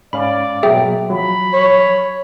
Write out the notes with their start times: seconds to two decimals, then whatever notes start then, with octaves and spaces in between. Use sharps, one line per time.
0.13 G#2 C#4 D5 F5 B5
0.63 B2 F#3 A#3 G#4 E5 G5
1.10 F3 F#3 B5
1.54 C#5